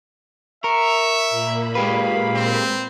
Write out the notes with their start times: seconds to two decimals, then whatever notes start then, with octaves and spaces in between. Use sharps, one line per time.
0.64 A#4 E5 C#6
1.29 A#2 A#3 B5
1.75 G#3 G4 B4 F5
2.35 C4